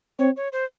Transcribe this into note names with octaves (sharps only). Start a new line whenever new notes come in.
C4 C#5
C#5
C5